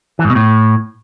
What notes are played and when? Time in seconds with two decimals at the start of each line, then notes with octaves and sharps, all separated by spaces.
0.19 E3
0.24 G#2
0.30 B2
0.35 A2